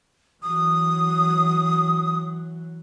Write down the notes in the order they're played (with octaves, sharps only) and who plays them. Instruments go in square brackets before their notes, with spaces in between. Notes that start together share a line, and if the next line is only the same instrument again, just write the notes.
[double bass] E3 F#3 [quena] D#6